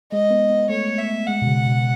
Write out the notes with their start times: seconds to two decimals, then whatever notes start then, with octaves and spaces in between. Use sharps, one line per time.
0.11 G#3 D#5
0.30 B3
0.50 B3
0.69 A3 C#5
0.98 E5
1.27 G#3 F#5
1.42 B2
1.47 C#3
1.66 B2